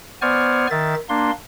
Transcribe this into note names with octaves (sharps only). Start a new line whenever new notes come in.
B3 C5 D5 G#5 C#6 F6
D#3 E5 A6
A#3 D4 C6